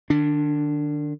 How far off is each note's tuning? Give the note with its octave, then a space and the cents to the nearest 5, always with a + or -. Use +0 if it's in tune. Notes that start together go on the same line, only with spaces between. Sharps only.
D#3 -45 D4 +0